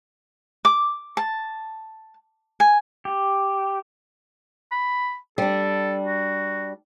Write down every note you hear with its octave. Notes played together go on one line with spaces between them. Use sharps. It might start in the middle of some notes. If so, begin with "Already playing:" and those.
D6
A5
G#5
G4
B5
G3 D4 A4
F#4